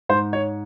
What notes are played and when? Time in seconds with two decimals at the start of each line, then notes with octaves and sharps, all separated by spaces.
0.09 G#2 C5
0.33 C#5